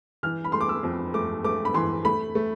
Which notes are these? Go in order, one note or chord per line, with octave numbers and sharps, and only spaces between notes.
E3 F6
B5
A3 C6
D6
E6
F2
A3 D6
A3 D6
B5
E3 C6
A3 B5
A3